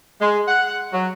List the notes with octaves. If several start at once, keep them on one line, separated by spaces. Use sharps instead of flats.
G#3
F#5
F#3